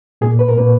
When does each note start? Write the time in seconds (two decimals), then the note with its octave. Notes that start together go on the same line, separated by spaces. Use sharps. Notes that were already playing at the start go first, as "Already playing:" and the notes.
0.21 A#2 A#3 G#4
0.39 B4
0.49 A#4
0.58 A#2 A#3 B4